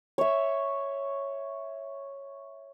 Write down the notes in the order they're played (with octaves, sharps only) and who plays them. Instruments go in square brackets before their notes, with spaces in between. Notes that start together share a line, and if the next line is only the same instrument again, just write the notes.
[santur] C#5 E5